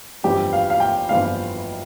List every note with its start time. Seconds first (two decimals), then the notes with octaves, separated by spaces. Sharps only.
0.23 G1 F2 E3 G3 B3 G4
0.53 F5
0.70 F5
0.80 G5
1.09 G1 F2 E3 G3 B3 F5